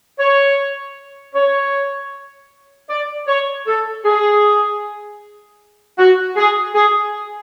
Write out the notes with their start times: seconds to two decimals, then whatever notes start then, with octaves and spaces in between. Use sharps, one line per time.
0.19 C#5
1.35 C#5
2.90 D5
3.28 C#5
3.67 A4
4.05 G#4
5.99 F#4
6.36 G#4
6.75 G#4